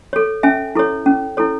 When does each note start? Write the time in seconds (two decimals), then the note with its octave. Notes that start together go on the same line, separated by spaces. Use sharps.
0.13 A4 C#5
0.43 C#4 E5 G#5
0.75 E4 A4 C#5
1.06 C#4
1.37 E4 A4 C#5